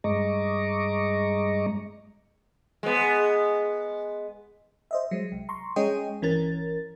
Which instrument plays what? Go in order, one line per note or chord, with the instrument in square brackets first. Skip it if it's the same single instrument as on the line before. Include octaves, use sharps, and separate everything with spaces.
[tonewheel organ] G2 G#3 D#5 A#5 C#6 D6
[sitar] G#3 B3
[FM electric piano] C5 D#5 E5
F#3 G#3
C2
A#5 C6 C#6
G#3 C#4 G#4 C#5 D#5 G5
G1 E3 C#4 A#4 A6